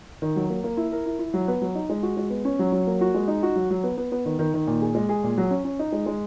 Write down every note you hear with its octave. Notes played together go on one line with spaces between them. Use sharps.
D#3
F#3
A#3
A#3
E4
A#4
E4
E4
F#3
B3
F#3
D#4
G#3
F#4
G#3
B3
C#4
F#3
F#3
A#3
F#4
G#3
D#4
F#4
F#3
F#3
B3
B3
B3
D#3
D#3
D#3
A#2
G#4
G#3
G#4
A#2
F#3
C#4
C#4
D#4
G#3
G#3